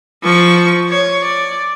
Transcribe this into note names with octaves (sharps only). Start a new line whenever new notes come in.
F3 C#6
C#5
D5